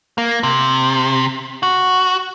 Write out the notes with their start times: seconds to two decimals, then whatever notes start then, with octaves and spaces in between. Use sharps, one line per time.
0.18 A#3
0.43 C3
1.63 F#4